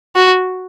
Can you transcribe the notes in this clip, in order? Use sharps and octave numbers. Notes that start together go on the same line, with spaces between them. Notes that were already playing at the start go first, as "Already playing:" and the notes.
F#4